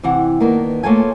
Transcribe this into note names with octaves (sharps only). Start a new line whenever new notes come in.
C3 E3 F#5
D#3 A#3 B3 D4
A3 A#3 F4 A4 C#5 G#5